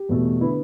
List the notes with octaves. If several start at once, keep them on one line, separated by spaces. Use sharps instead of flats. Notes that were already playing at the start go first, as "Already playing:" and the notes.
Already playing: G4
E2 B2 A3
D3 B3 E4